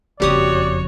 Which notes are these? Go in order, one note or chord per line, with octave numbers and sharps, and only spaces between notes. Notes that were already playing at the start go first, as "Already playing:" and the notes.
F#1 F2 G3 F#4 G4 C#5 D5 D#6